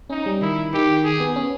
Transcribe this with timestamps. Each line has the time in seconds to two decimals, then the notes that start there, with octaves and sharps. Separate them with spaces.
0.09 C#4 D#4
0.26 G3
0.41 D#3 E4
0.73 D#3 G4
1.04 G#4
1.20 B3
1.36 C#4